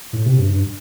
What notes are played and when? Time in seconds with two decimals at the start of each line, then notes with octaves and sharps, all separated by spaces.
0.13 A2
0.26 C3
0.38 G2
0.51 G2